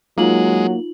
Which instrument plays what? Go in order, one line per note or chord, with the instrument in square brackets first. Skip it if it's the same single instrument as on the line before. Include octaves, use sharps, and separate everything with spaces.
[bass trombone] F#3 [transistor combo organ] G#3 [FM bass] A#3 [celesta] D#4 F4 F#7